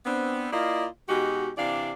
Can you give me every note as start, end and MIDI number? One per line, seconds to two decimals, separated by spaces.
0.05 0.47 59
0.05 0.47 60
0.05 0.47 62
0.52 0.86 58
0.52 0.86 64
0.52 0.86 65
0.52 0.86 74
0.52 0.86 75
0.52 0.86 77
1.08 1.51 47
1.08 1.51 56
1.08 1.51 63
1.08 1.51 66
1.08 1.51 67
1.57 1.93 48
1.57 1.93 52
1.57 1.93 62
1.57 1.93 74
1.57 1.93 77